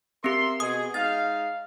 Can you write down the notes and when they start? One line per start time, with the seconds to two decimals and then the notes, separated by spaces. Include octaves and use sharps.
0.24 C4 G4 A#4 E5 C6
0.60 B2 G#4 D#6
0.94 G#3 D#4 F5 A6